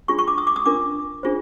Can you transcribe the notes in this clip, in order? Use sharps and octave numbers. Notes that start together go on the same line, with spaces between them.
D4 F4 G#4 C#6
C#6
D6
D#6
D6
D#6
D4 F4 A#4 D6
D4 F4 G#4 C5